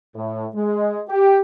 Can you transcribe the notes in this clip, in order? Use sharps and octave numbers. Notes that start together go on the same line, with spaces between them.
A2
G#3
G4